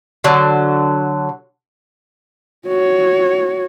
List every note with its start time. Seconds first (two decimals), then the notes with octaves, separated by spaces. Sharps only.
0.24 D3 F#3
2.67 F#4 C#5